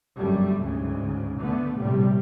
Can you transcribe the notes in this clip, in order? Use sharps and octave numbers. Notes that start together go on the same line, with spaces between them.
G1 F#2 G3 A3
D2 G#2 C#3
D3 A3 B3
A#1 A2 C3 G3